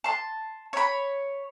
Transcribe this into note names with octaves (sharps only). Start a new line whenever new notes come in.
A5 C6
C#5 B5